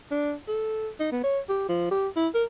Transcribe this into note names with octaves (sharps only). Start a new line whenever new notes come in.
D4
A4
D#4
B3
C#5
G4
F3
G4
E4
A#4